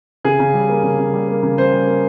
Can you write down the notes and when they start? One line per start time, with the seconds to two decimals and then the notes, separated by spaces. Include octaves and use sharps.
0.24 C#3 G#4
0.39 C#3
0.54 G3
0.69 A#3
0.83 C#3
0.98 C#3
1.13 G3
1.28 A#3
1.43 C#3
1.57 C#3 C5
1.72 G3
1.87 A#3